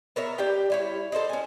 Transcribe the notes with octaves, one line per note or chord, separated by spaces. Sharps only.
B3 A#4 C#5 E5
D4 G4 G5
G3 E4 C#5
A4 C5 D5 D#5
C#4 G#5